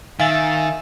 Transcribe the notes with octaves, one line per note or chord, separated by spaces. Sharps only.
D#3 E5 F5 G#5 A6